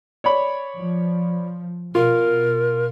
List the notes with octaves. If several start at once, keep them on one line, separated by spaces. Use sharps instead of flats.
C#5 D5 B5
F3
B2 F4 A#4